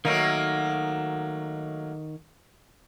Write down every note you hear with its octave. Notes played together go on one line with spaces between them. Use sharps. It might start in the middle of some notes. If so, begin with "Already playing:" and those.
D#3 F#3 A3 A#3 D#4 F#4